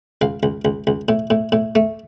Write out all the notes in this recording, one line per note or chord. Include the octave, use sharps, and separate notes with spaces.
C#2 F5
C#2
C#2
C#2
A2
A2
A2
A3